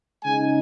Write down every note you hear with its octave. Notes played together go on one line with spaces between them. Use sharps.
C#3 G#3 D#4 G#5